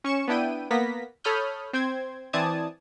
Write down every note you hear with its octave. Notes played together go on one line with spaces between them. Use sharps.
C#4 C#6 C#7 E7
B3 D4 E4 G5 D#7
A#3 B3 A#6 B6
A4 C#5 B5 D#6 F6 G6
C4 C5 G5 G#6
E3 C4 D5 A5 D#6 G#6